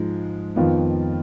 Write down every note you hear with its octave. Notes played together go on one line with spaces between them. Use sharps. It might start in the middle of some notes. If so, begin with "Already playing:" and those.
Already playing: G#2 F3 G#3
F2 D#3 B3 F4